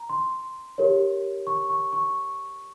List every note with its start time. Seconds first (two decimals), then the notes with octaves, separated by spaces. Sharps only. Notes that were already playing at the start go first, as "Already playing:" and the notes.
Already playing: A#5
0.09 C6
0.78 G4 A#4 C#5
1.47 C#6
1.70 C#6
1.93 C#6